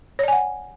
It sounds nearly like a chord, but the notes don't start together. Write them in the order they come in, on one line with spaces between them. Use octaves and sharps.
C#5 D5 G#5 F#5